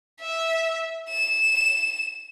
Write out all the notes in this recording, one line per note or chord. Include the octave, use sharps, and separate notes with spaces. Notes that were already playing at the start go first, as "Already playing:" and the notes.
E5
E7